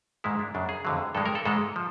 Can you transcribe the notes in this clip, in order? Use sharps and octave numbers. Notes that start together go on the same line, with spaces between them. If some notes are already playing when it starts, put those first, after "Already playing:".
G#2 D#3 G#3 E4
D4
F#2 C#3 F#3 D4
G#4
F2 D3 F#3
G2 E3 G#3 A4
A#4
A4
G#2 E3 G#3 A4
F3